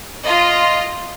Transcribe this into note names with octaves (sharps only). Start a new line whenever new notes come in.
F4 D#5